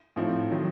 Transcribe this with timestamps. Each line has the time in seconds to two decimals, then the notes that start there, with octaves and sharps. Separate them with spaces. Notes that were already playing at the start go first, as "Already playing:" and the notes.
0.16 A2 F3 C4 D#4
0.52 D#3 F#3